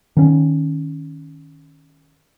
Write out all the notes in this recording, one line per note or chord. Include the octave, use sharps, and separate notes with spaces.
D#3 C#4